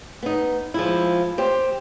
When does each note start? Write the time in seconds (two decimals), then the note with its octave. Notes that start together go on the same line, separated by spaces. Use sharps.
0.23 B3 D#4
0.74 F3 G#3 E4
1.38 G4 C5